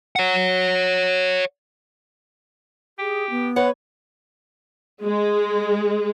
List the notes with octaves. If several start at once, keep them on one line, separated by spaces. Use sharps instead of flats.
C#5 F#5
G4 G#4
B3
B4 C#5 F#5
G#3